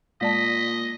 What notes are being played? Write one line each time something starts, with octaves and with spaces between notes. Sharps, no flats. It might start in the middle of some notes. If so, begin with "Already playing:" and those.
A#2 G#3 D5 D#5 A5 B6